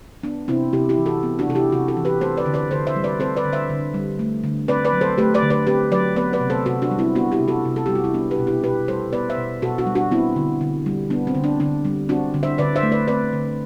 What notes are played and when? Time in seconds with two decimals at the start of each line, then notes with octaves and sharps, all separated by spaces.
0.23 B3 D4
0.48 C3 C4 E4
0.73 C3 E4 G4
0.89 E4 G4
0.98 E3
1.06 F#4 A4
1.23 B3
1.39 D4 F#4
1.48 C3 A4
1.55 E4 G4
1.72 C3 D4 F#4
1.88 F#4 A4
1.97 E3
2.05 G4 B4
2.21 C4 A4 C5
2.37 B4 D5
2.46 D3
2.54 B4 D5
2.71 D3 A4 C5
2.87 C5 E5
2.96 G3
3.04 B4 D5
3.20 C4 A4 C5
3.36 B4 D5
3.44 D3
3.53 C5 E5
3.69 D3
3.94 G3
4.19 A3
4.44 D3
4.68 C4 B4 D5
4.85 B4 D5
4.93 F#3
5.01 A4 C5
5.18 A3 G4 B4
5.34 B4 D5
5.42 D3
5.50 B4 D5
5.67 C4 G4 B4
5.92 F#3 B4 D5
6.16 B3 B4 D5
6.33 B4 D5
6.41 C3
6.50 A4 C5
6.66 C3 F#4 A4
6.82 D4 F#4
6.91 G3
6.99 C4 E4
7.15 B3 D4 F#4
7.32 E4 G4
7.40 C3
7.48 F#4 A4
7.65 C3
7.76 A4
7.86 G3 G4
7.95 F#4
8.04 E4
8.14 B3 D4
8.31 G4 B4
8.39 B2
8.47 E4 G4
8.63 B2 G4 B4
8.88 G3 A4 C5
9.13 B3 B4 D5
9.30 C5 E5
9.38 B2
9.62 B2 F#4 A4
9.78 D4 F#4
9.87 G3
9.95 D4 F#4
10.11 B3 C4 E4
10.36 D3
10.61 D3
10.86 G3
11.10 B3 D4
11.27 C4
11.35 D3
11.44 D4
11.60 D3 D4
11.85 G3
12.09 C4 D4 F#4
12.34 D3
12.43 C5 E5
12.58 D3 B4 D5
12.76 C5 E5
12.83 A3
12.92 B4 D5
13.08 C4 B4 D5
13.33 D3